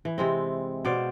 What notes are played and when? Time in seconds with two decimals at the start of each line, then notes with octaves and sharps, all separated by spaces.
0.05 E3
0.18 C3 G#3 C4
0.85 B2 C5 D5 F5